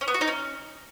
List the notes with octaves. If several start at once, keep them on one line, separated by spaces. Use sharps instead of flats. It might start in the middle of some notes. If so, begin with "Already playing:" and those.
C#4
B3
F#4
D#4
C#4